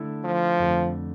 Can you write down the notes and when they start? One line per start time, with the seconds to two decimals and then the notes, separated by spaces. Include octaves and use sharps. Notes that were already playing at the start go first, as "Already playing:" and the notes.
Already playing: D3 A3 E4 A4
0.24 F3
0.59 F2 D3 A3